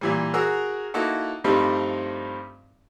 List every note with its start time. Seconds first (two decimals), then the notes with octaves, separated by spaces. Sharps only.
0.01 A#2 E3 G3
0.34 F#4 G#4 A#4 E6
0.94 A#3 D#4 E4 F#4 A4
1.44 G2 F3 G3 A3 C4 D#4